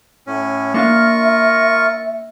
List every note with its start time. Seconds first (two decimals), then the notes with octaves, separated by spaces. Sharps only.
0.27 A2 C#4
0.74 A#3 D4 F4 A#4 E5 F5 C#6